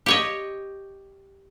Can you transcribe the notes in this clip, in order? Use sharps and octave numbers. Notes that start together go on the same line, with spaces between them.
G4 C#5 D#5